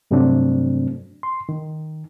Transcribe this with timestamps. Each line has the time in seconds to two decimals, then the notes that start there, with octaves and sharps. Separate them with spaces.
0.11 G2 C3 F#3 A3 C4 D4
1.23 C6
1.49 D#3